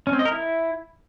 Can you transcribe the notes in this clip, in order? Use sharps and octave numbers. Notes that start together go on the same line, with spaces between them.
C#4
C4
D#5
A#4
E4